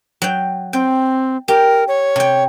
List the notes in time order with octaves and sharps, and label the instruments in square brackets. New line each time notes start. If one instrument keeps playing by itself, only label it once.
[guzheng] F#3 G5
[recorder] C4 [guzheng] G5
[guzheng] G4 [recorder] A#4
[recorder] C#5
[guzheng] C3 G5